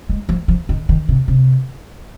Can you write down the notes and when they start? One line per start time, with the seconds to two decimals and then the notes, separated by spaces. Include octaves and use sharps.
0.09 G#3
0.29 F3
0.48 F3
0.69 D#3
0.89 D#3
1.09 C3
1.28 C3